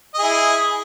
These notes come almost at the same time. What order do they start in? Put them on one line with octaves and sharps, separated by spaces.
D#5 G#4 E4